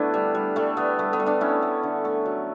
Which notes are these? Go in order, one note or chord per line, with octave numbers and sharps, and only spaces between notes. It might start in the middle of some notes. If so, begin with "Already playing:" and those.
Already playing: D3 A3 B3 D4 E4
G3
G3
G3 A3
G3 B3
G3 A3
B3
G3
B3 D4
A3 C#4 E4
A3
D3
A3
F#3